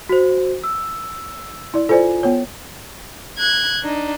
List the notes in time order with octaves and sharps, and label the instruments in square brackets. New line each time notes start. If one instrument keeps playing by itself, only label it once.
[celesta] F#4 C5
E6
[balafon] E4 D5
[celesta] F4 G#5 [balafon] A4 C5 D5
[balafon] B3 C#5
[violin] F#6 G#6
D4 D#4